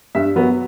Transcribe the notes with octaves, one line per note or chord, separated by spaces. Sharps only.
G2 E5
F#3 B3